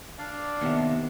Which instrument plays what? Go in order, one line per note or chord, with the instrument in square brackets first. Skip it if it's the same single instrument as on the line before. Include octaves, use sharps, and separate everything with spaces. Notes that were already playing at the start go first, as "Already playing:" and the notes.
[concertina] D4 D5 F5
[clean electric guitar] D#2 C3 [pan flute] B3